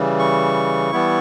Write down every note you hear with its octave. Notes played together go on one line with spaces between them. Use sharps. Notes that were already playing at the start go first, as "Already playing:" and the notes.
Already playing: C#3 E3 G3
C#6
E3 G3 B3 E4